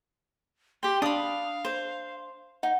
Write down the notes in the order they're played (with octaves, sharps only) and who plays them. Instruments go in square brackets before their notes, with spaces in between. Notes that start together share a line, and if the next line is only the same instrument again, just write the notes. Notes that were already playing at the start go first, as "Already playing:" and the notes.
[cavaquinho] G4 G5 [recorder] C6
[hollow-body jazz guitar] D4 [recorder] F5 [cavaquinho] B5 D#6
[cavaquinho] C5
[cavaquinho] D#4 [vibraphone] F#5